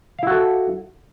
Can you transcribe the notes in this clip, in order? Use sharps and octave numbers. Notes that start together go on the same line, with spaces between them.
E4 F#4 A4 F5